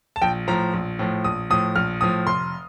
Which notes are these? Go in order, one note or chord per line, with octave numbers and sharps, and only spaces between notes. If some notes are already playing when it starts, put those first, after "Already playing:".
A5
A#1 G5
A2 F3 A#5
A#1
A2 F3
A#1 D#6
A2 F3 D#6
A#1 F6
A2 F3 D#6
F1 C6